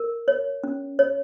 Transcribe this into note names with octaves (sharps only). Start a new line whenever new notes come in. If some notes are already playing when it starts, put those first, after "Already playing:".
Already playing: A#4
C#5
C#4
C#5